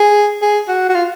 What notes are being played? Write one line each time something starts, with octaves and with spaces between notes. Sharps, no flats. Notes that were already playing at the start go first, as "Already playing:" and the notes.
Already playing: G#4
G#4
F#4
F#4
F4